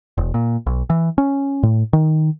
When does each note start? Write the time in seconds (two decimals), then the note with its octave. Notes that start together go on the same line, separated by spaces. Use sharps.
0.18 E1
0.34 A#2
0.66 B1
0.90 E3
1.18 C#4
1.63 A2
1.93 D#3